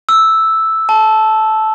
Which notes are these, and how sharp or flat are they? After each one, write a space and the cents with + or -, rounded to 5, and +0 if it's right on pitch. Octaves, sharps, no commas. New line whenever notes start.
E6 -5
A5 -10